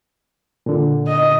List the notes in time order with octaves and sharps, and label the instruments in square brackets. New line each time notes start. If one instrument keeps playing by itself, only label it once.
[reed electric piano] A#2 D3
[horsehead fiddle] D#5